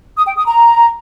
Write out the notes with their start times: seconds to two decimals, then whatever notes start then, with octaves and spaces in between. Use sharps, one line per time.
0.17 D#6
0.26 G5
0.36 D#6
0.46 A#5